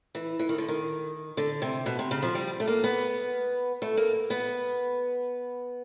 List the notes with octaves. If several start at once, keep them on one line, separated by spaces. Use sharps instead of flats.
E3
E3
D#3
D3
D#3
D3
C3
B2
C3
C#3
F3
G3
A3
A#3
B3
A3
A#3
B3